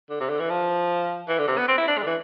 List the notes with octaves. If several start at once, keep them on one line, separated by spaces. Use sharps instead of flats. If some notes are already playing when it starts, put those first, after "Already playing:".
D3
C3
D3
E3
F3
E3
D3
C3
B3
C4
E4
D4
G#3
D3
E3